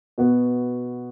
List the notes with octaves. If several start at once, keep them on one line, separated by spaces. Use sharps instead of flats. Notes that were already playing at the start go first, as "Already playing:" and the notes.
B2 B3 F#4 B4